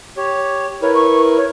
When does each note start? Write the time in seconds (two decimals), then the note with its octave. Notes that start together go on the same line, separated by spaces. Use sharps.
0.17 G4 C#5
0.82 E4 A#4 B4 C#5
0.95 C#6
1.37 C#5